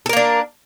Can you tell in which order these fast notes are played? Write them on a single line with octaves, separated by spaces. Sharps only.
A4 A#4 A#3 D4